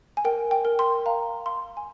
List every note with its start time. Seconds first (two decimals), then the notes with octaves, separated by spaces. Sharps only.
0.17 G#5
0.25 A#4 G5
0.51 G5
0.65 A#4
0.79 C6
1.06 F5 A#5
1.46 F5 C6
1.77 G#5